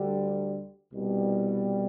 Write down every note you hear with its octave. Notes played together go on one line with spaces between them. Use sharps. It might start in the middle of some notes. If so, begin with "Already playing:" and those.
Already playing: D2 D3 G3
C2 B2 G3